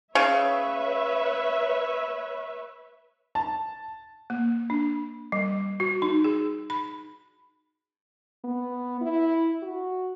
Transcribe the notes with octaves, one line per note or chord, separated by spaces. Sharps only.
C#3 B4 C#5 E5
A5
A#3
D4
G3
F#4
D#4
G#4
B5
B3
E4
F#4